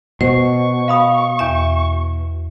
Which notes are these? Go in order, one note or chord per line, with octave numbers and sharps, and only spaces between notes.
B2 C5 C#6
F5 B5 D#6
E2 E5